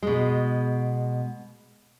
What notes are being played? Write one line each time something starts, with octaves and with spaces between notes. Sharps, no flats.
B2 G#3